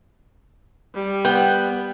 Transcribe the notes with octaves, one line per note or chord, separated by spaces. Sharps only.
G3
B3 G5